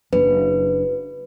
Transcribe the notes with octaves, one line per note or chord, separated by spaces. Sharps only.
F#1 D4 B4